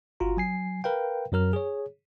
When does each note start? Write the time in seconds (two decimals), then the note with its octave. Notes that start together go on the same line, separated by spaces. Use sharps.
0.20 G1 F4 F#4 A#5
0.37 F#3 G#5 C7
0.84 A#4 B4 F5 G5
1.32 F#2 F#3 A#4 F6
1.53 G#4 C#5